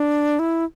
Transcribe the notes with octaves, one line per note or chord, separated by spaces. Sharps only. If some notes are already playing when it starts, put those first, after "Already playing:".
Already playing: D4
E4